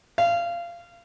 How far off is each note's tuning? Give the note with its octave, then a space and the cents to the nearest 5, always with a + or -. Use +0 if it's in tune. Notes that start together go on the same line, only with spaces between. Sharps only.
F5 -20